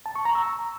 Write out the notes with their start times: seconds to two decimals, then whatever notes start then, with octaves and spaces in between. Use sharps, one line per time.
0.06 A5
0.15 C#6
0.25 A#5
0.35 E6